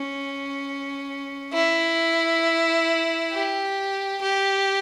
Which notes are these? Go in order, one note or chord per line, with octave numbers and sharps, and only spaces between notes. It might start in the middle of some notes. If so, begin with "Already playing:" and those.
Already playing: C#4
E4
G4
G4